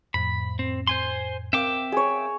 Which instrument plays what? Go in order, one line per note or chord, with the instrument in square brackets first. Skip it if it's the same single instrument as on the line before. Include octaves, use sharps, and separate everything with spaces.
[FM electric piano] F2 A2 [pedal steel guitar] B5
[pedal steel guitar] C4
C5 G#5 C6
[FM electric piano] C4 A#4 F5 [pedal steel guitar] E5 G5 D6
[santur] G#4 C#5